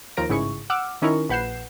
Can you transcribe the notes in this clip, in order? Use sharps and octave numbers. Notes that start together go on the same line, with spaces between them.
D#2 F3 A#4 A#6 D7
A1 G#2 C#3 E4 G#4 C#6
F#5 D6 E6 F6
D#3 C#4 D#4 E4 A#4 C#6
A#1 B4 F#5 G6 C7 E7